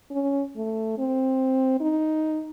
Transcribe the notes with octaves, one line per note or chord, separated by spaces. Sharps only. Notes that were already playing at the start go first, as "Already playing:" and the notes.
C#4
A3
C4
D#4